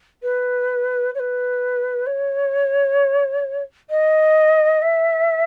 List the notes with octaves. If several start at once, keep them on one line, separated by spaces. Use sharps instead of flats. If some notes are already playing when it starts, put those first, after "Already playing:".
B4
C#5
B4
C#5
D#5
E5